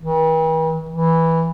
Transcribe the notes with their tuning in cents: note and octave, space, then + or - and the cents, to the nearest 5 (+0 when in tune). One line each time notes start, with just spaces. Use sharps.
E3 -45
E3 -5